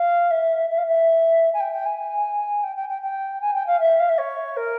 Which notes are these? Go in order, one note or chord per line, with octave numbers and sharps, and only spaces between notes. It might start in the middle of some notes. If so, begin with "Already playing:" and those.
Already playing: F5
E5
E5
F5
E5
G#5
G5
G5
G#5
G5
G5
G5
G5
G#5
G5
F5
E5
F5
E5
C#5
A#4